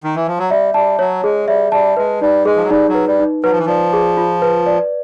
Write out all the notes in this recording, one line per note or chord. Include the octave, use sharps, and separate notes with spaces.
D#3
E3
F3
F#3
G3 E5
G3 A5
F#3 C#5
G#3 G#4
G3 E5
G3 A5
G#3 B4
G3 D#4
G#3 G#4
F3
F#3
G3 D#4
F#3
B4
G3
D#4
F#3 B4
F3
E3
F3 D5
G#4
F4
B4
D5